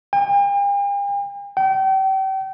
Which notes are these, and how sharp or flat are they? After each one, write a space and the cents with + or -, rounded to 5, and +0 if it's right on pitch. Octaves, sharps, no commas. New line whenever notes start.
G5 +45
G5 -35